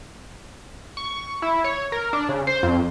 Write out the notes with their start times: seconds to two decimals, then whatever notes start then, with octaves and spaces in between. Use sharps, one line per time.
0.97 C#6
1.42 E4
1.64 C#5
1.92 A#4
2.13 D4
2.29 C#3
2.47 C5
2.63 F2